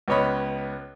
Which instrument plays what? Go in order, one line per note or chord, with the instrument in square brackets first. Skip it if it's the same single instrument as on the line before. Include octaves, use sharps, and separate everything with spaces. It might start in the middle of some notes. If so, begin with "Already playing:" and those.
[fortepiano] C#2 B3 C#4 C#5 D#5 B5